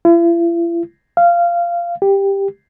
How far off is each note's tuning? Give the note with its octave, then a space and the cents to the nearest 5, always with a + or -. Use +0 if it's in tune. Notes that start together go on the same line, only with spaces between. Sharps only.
E4 +45
F5 -15
G4 +10